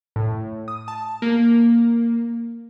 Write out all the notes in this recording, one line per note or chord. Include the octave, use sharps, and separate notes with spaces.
A2
D#6
A5
A#3